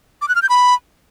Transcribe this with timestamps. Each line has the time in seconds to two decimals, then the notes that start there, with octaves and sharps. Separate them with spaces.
0.22 D6
0.28 F#6
0.35 F6
0.42 G6
0.49 B5